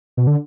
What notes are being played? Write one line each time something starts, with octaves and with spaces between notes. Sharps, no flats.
B2
D3